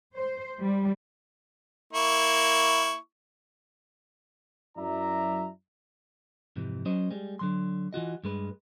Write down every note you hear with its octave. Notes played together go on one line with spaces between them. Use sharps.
C5
G3
A#3 E4 C#6
F#2 F#3 E4 D5 E5 A#5
F2 G#2 C3 E3
F#3 C#4 C5 D#5
G3 G#3
D3 F#3 C6
E3 F4 F#4 D#5
G2 G#3 B4